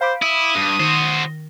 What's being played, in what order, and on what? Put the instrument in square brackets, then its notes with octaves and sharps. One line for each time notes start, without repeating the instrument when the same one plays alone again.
[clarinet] C5 [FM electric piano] F5 B5 D6
[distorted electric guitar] E4 [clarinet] D#6
[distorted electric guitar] G2
[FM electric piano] D#3 [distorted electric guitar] F#4 C5